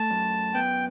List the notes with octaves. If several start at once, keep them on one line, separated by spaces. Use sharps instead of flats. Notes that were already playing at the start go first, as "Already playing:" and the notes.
Already playing: A3 A5
F#2
B3 G5